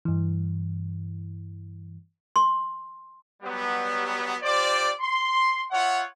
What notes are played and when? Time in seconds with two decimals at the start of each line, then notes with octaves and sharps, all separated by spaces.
0.05 G2 E3
2.36 C6
3.43 F#3 G3 B3
4.43 F4 G4 C5 D5
5.00 C6
5.71 F4 C#5 E5 F#5